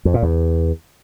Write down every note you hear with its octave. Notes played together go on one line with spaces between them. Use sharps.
F2
A#2
E2